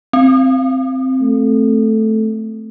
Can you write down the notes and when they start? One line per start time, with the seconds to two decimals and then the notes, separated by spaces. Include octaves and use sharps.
0.13 C4
1.21 A3